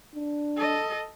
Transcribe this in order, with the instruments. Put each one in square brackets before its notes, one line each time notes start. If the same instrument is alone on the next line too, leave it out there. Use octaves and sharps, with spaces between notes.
[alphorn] D4
[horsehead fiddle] A4 D#5